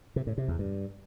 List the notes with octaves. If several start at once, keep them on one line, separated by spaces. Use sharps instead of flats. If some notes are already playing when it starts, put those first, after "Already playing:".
C3
A2
C3
E2
G2